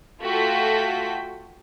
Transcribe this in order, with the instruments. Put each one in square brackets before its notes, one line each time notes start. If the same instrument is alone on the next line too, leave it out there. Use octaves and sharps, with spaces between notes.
[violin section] A3 F4 F#4 A4 G5 B6